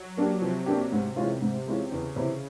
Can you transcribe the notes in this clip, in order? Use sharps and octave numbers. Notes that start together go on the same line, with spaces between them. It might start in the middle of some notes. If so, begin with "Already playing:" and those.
Already playing: F#3
A#3 D4 G4
C3 F3
A#3 D4 G4
G#2 C3
E3 G#3 C#4 F4
G#2
E3 G#3 C#4 F4
E2 C#3
C3 E3